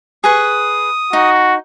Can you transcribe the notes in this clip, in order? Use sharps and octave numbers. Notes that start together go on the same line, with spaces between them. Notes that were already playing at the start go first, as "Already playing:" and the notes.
G#4 B4 C#6 D#6
D#4 F#4